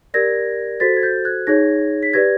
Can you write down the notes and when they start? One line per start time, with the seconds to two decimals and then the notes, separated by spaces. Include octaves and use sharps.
0.14 G4 A#4 D5 G#6 A#6
0.80 F#4 A4 C5 A6 B6
0.97 G#6
1.02 G6 A6
1.25 F#6 G#6
1.47 D#4 G#4 C#5 G#6 A#6
2.03 B6
2.13 G4 B4 D5 G#6 A#6